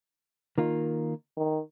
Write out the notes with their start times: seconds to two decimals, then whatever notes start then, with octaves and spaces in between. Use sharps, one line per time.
0.58 D#3 A#3 F4
1.37 D#3